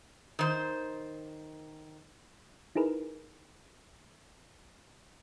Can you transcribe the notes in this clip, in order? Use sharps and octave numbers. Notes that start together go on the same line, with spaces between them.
D#3 C5
D#4 E4 G#4 A#4 B4